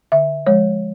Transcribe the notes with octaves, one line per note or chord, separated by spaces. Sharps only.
D3 E5
F3 G#3 C#5